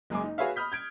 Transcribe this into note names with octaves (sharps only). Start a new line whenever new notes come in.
F#1 F#2 G#3 G#5 D6
D#4
F#4 G#4 B4 C#5 E5 F5
B5 D#6 F6 G6 B6
G6 G#6 D7